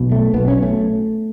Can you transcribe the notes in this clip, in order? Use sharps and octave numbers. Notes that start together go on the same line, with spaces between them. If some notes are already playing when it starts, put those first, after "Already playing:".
Already playing: B1 B2
A3
B1 B2 B3
C#4
A3